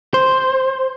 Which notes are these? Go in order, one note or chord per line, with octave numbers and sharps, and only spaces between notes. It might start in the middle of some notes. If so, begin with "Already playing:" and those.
C5